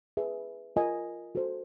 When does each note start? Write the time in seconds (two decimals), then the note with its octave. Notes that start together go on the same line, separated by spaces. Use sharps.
0.17 G#4 B4 E5
0.76 F4 A#4 D#5 G#5
1.35 F#4 A4 C5